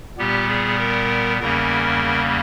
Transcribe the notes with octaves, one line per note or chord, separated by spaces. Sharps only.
A#2 G3 B3 G4
G#4
A#4
E2 C#3 G3 A#3 C#4 A#4